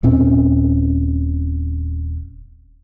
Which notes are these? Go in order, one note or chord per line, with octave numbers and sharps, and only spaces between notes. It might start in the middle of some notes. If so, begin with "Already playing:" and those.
D#1 A#2 C4 C#4